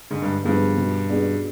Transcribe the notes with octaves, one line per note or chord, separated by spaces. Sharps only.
G#2 D3
G2
G2 F3 G#3 B3
B2
B3 D4 G#4 D5